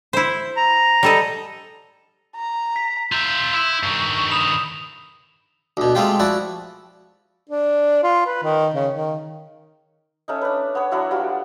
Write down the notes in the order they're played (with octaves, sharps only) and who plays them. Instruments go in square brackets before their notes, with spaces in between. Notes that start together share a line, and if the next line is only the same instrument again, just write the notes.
[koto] E4 C5
[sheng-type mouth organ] A#5
[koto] G3 A4 D#5
[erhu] A#5
[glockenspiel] B6
[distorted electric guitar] F4 E5 [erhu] C6 [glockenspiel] G6
[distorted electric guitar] E4 [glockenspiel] E6
[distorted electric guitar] G2 D#3 [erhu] C#6
[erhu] B5 [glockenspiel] D#6 E7 F7
[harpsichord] D2 B2
G#3 A3 C4 F4 G4
F3 E4 F#4 D5
[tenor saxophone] D4
F4
B4
D#3
C#3
D#3
[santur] A3 C#4 D#4
D4 B4
B3 C#5
F#3 D4 E4 F#4
G3 F4 F#4